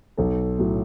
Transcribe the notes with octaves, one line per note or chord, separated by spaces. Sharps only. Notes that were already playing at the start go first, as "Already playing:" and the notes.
B1 A4
A2 F#3